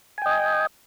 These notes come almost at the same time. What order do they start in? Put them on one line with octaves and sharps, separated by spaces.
G#5 G5 D#5